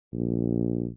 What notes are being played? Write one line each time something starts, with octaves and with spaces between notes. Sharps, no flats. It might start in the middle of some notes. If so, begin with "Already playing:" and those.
A#1